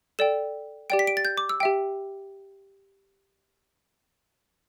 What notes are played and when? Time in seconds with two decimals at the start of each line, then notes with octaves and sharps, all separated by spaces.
0.19 A4 D5 G5 E7
0.90 G4 D5 G5 D7
0.99 B6
1.07 D7
1.17 A6
1.25 G6
1.37 D6
1.49 E6
1.60 G4 E5 G5